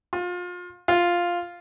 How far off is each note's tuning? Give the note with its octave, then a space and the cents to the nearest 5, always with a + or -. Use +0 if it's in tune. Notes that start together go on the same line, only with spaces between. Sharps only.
F4 +30
F4 +0